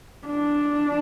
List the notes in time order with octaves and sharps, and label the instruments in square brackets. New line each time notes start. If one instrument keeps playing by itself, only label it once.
[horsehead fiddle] D4